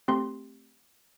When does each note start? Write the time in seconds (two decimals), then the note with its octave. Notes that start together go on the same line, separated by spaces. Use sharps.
0.08 A3 C4 G4 C6